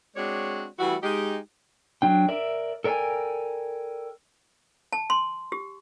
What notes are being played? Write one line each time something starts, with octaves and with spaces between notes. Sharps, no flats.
G#3 C4 D4 F#4 C#5 D5
E3 G3 A3 E4 F#4
G#3 D#4 G4
F#3 D4 G5
A#4 D5 E5
A4 A#4 D5 E5 G5 G#5
A5
C6
G4